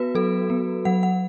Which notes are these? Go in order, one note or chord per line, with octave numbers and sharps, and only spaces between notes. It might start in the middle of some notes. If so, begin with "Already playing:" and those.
Already playing: B3 F#4 B4
F#3 A4
B3
F#3 F#5
F#5